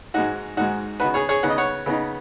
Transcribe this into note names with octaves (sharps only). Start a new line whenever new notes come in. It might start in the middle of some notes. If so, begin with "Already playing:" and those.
G#2 G#3 D#4 F#4
G#2 G#3 D#4 F#4
C#3 B3 D#4 F#4 B4
G#4 C#5
G#4 C#5
C#3 B3 D#4 F#5
D#5
C#5 F#5
C#3 B3 D#4